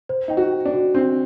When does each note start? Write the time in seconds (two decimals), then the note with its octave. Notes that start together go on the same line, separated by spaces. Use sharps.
0.09 C5
0.28 D#4 G5
0.37 F#4
0.52 G5
0.65 D4
0.73 F#4
0.94 C4 D4